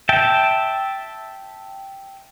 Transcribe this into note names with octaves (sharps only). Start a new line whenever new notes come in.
E5 G5 A5